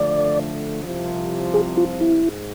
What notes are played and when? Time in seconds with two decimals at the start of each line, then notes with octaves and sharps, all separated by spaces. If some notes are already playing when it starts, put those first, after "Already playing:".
Already playing: D3 F3 A3 D5
0.84 C2 C3 F3
1.54 G#4
1.77 F4
2.01 E4
2.24 G#2